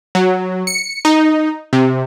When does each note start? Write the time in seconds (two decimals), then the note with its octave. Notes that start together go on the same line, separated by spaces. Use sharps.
0.15 F#3
0.67 C#7
1.05 D#4
1.73 C3